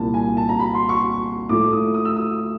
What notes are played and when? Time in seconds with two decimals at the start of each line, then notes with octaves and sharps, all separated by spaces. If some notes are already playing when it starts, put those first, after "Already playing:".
Already playing: C2 A#2 G3 A5
0.14 G#5
0.37 A5
0.49 A#5
0.59 B5
0.74 C6
0.89 C#6
1.49 A2 F3 A3 D6
1.72 D#6
1.94 D#6
2.05 E6
2.16 D#6